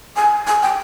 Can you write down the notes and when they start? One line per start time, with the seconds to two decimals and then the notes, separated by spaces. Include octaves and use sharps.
0.16 G#5
0.47 G#5
0.62 G5